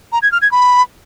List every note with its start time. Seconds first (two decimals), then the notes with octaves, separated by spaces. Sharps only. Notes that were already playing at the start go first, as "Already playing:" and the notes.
0.12 A#5
0.22 G#6
0.32 F6
0.42 G#6
0.51 B5